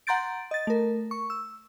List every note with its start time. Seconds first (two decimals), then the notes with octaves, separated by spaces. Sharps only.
0.07 F#5 A#5 C6 G6 A6 D7
0.51 D#5 A6
0.67 A3 A#4
1.11 C#6
1.30 E6